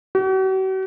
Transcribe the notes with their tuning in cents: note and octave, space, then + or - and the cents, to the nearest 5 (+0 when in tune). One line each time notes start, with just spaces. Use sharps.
F#4 +45